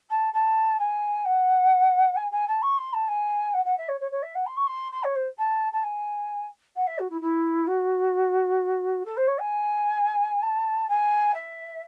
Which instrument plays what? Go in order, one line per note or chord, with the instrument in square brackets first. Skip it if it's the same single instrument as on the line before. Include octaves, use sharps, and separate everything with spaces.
[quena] A5
A5
G#5
F#5
G#5
G#5
A5
C#6
C6
A5
G#5
F#5
F#5
E5
C#5
C#5
C#5
E5
F#5
C6
C#6
C6
C6
C#5
C5
A5
A5
G#5
F#5
E5
F#4
E4
E4
F#4
A4
C5
C#5
G#5
A5
G#5
E5